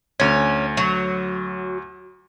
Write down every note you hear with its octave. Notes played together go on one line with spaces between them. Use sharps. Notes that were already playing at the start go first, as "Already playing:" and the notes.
D2 C#4 G#6
F#3